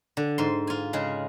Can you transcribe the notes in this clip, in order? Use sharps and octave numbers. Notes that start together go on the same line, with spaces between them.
D3
G#2 C6
F4 G#5
C#3 G#3 G#4